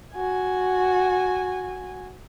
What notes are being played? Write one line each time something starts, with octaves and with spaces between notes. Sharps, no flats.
F#4 G#5